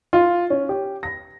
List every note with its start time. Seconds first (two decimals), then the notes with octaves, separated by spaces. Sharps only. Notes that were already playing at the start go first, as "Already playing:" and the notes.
0.13 F4
0.50 C#4
0.69 G4
1.03 A#6